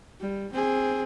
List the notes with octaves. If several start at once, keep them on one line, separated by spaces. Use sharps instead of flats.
G3
C4 G#4